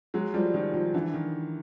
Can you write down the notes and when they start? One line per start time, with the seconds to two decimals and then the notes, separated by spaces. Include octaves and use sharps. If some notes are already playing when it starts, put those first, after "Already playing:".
0.14 F#3 G#3
0.34 F3 G3
0.54 D#3 F3
0.74 D#3 F3
0.94 D3 E3
1.14 D#3